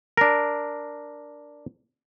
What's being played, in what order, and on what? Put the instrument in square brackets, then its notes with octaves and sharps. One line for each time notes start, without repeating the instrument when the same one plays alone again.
[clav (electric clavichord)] D4 A#4